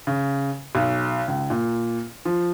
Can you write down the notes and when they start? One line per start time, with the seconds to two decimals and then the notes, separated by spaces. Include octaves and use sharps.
0.07 C#3
0.75 B1
1.28 C#2
1.50 A#2
2.25 F3